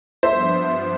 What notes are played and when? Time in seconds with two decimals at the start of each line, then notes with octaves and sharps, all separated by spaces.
0.23 G2 F3 B3 D4 C5 E5